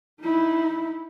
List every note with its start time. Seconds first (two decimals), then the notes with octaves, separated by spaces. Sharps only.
0.21 D#4 E4